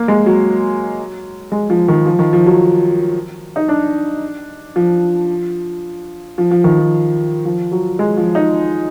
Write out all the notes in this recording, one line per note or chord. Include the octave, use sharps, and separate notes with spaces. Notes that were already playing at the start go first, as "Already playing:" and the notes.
Already playing: A#3
G#3
F#3
G#3
F3
D#3
F3
D#3
F3
F#3
D#4
D4
F3
F3
F3
D#3
F3
F3
F#3
G#3
F3
D#4